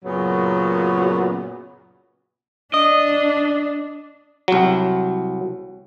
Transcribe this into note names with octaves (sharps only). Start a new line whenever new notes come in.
F#2 A#2 C#3 F#3 B3
D4 D#5
C2 F#3